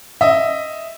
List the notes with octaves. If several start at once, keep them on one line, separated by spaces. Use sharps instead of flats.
D#5 E5